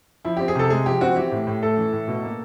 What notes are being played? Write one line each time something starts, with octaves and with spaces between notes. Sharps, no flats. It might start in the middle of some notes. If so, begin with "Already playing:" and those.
F3 E4
C4 G4
G#4
C3 A4
G#3 G#4
F3 G4
C4 F#4
E3 G4
A2
A2
A3 A4
E3
A2
B2
A#3